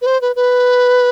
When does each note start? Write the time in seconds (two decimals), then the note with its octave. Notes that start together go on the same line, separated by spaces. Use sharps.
0.02 B4
0.06 C5
0.21 B4
0.36 B4